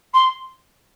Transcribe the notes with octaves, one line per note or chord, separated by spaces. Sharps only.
C6